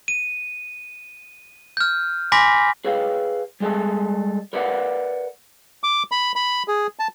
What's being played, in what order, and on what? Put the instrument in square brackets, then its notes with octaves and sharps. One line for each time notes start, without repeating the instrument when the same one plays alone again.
[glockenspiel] D#7
F6 G6
G#5 B5 C6 D6 A#6 B6
[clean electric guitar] G#4 B4 C#5 F5
G3 G#3 G#4 A4
A#4 B4 D5 E5 F#5
[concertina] D6
B5
B5
G#4
A5